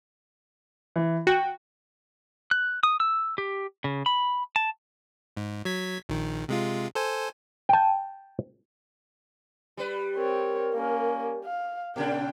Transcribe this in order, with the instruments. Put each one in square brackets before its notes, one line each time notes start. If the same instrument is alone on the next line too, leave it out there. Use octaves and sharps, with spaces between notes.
[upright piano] E3
[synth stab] F#4 [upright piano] G5
[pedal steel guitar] F#6
D#6
E6
G4
C#3
B5
A5
[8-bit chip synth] G#2
F#3 G#6 B6
A#1 D#3
C3 G#3 F4
A4 C5 G#5
[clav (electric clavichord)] G5 A5
[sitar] G3 B4
[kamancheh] C4 C#5 [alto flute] A#4
[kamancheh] A#3 C#4
F5
[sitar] A#2 C#3 D4 [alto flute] A#4 [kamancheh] G5